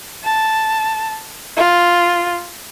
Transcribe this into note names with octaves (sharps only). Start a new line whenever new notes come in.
A5
F4